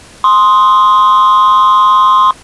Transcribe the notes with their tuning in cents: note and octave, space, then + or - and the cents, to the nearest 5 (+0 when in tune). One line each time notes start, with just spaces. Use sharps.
C6 +0 D#6 +5